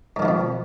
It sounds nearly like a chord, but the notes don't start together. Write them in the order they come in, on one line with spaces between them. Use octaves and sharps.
G#2 D#3 F3 F2 B2